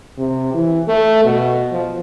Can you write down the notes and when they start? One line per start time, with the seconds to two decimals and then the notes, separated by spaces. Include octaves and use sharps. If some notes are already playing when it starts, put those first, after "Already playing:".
0.18 C3
0.54 E3
0.88 A3
1.24 B2
1.72 F3